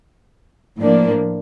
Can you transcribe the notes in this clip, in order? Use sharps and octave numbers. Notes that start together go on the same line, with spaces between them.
A2 F3 A#3 D4